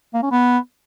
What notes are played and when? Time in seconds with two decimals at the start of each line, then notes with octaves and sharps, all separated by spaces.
0.14 A#3
0.23 C#4
0.31 B3